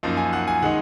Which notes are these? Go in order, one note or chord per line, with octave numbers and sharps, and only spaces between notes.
F#2 F3 A#3 D#4
G#5
F#5
G#5
D#3 G#3 D#4 F#5